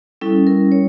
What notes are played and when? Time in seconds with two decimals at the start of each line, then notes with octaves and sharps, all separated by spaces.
0.21 G3 C#4 E4 A4
0.47 A#4
0.72 C#5